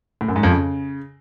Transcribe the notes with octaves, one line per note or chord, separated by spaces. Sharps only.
A2
F#2
G#2
F2
C#3